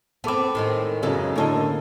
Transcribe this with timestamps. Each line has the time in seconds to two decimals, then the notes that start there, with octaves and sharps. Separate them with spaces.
0.24 B3 C4 A4 D6
0.55 A2 D#3 G#3
1.03 F#2 C#3 G#3 B3 A4
1.36 A2 D3 A#3 C#5 D#5 A5